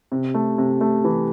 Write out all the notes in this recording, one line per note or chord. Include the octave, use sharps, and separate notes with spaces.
C3
A3
C3
A3
E3